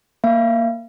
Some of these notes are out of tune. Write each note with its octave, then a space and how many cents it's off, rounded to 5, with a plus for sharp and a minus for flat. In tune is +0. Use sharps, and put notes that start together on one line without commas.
A#3 +0 F5 -35